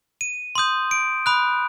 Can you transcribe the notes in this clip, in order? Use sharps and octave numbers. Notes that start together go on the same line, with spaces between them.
D#7
C6 D#6 G6
D7
B5 D#6 F#6